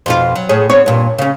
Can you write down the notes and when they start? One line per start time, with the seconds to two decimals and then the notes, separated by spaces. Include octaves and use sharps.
0.06 F2 B2 F4
0.35 F#3
0.49 A2 G#4 C#5
0.69 B3 C4 C#5
0.86 G2 A#2
1.18 C#3 C#4